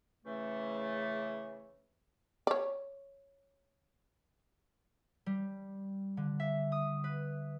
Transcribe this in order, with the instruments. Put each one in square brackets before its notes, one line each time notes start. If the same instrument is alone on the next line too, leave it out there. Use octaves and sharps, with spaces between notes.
[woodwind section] C#3 E3 A3
[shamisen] C#5 D5
[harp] G3
D3
E5
D#6
B4